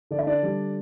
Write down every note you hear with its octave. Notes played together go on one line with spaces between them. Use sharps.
D3 D5
E5
D4 D5
G3